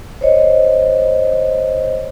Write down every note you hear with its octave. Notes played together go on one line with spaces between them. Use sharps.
C5 C#5 D#5